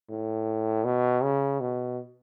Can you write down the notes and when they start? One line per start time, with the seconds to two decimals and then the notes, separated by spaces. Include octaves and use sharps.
0.09 A2
0.85 B2
1.23 C#3
1.60 B2